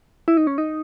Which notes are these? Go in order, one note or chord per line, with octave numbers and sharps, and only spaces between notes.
E4
D#4
C#4
D#4